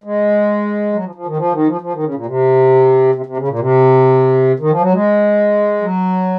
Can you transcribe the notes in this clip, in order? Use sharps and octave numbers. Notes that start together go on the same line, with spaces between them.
G#3
F#3
F3
F3
D#3
F3
D#3
F3
F3
D#3
C#3
A#2
C3
C3
C3
C#3
A#2
C3
D#3
F3
F#3
G#3
F#3